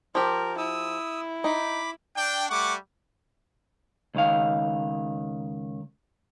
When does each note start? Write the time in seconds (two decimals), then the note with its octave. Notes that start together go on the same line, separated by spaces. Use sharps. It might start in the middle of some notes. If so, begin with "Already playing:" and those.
0.15 F3 G4 A#4
0.58 E4 D#6 E6
1.44 D#4 B5 D6
2.16 D4 G5
2.50 G3 A3 F#5 C#6 D6
4.15 C#2 D#3 F5